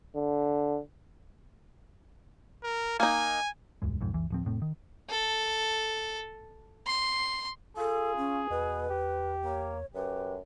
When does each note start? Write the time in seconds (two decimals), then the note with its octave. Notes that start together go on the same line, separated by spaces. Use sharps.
0.16 D3
2.63 A#4
3.00 A#3 D#4 G#5
3.82 E1 C#2 G2 G#3
4.01 B1 F2 G#2
4.13 F#1 C#2 E3
4.30 D1 F3 C4
4.45 F1 A2 C4
4.62 D#3
5.10 A4
6.87 C6
7.77 F4 G#4 A4
8.17 C#4
8.50 E2 B2 B4
8.89 G4
9.44 A#3 C#5
9.95 F#2 G4 B4